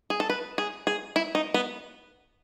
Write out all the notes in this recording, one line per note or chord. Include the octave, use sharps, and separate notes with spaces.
G#4
A4
B4
G#4
G#4
E4
D#4
B3